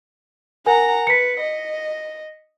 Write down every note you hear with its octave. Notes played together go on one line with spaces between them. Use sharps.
A#4 F#5 G#5 A#5
B4 B6 C#7
D#5